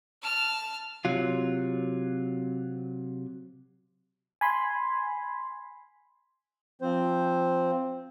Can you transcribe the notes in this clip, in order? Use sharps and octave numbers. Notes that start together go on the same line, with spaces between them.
A5 F6
C3 F#3 F4
G#5 B5 C6
F3 C4 C5